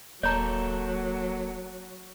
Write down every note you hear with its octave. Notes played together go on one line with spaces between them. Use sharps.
D#1 F#3 A#3 A4 C#5 A#5